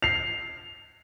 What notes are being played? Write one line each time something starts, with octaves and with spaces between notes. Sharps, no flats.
C7 F7